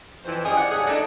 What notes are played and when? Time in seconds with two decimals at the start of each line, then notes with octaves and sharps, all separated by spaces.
0.24 F2 E3 C5
0.45 C#4 D4 G4 G#4 C#5 D#5
0.57 D5 F#5
0.71 G#2 C#3 G3 A3 G#4
0.86 A3 D4 D#4